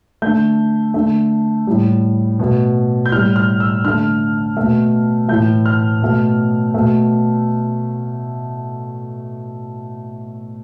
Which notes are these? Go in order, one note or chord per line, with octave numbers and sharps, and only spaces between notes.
D3 A3 G6
D3 A3
A2 G3
B2 A3
G6
A2 G3 F6
F6
E6
D3 A3 F6
B2 A3
A2 E3 A3 G6
F6
B2 A3
B2 A3